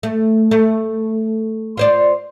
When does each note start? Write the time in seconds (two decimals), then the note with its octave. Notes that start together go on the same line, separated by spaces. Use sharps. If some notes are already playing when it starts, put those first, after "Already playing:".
0.03 A3
0.51 A3
1.77 F4 C5 D5